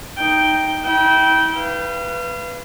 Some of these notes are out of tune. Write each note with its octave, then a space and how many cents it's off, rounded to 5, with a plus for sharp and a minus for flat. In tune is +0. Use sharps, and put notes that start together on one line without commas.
D#4 +0 G5 +0
E4 -40 G5 -15
B4 +0 F5 -35